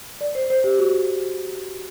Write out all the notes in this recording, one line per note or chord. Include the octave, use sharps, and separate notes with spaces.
D5
C5
C5
G4
F#4